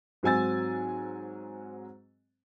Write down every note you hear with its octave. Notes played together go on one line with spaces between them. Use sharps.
G#2 F#3 C4 G#5 E6 A6